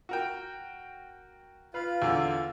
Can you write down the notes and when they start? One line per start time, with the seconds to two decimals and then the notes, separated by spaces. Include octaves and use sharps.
0.09 F#4 A#4 G5
1.74 F4 B4 F5
2.02 E2 D3